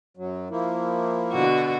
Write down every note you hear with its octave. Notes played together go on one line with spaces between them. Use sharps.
F#2 F#3
F3 A#3 E4
B2 D3 F#4